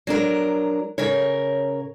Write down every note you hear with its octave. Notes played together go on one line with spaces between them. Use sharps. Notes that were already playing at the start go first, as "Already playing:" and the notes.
F#3 D4 A#4
C#3 A#4 C#5